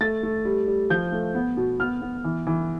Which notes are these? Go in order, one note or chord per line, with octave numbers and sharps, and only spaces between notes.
A3 A6
A3
G3
G3
F3 G6
A3
B3
B2
B3 F6
B3
E3
E3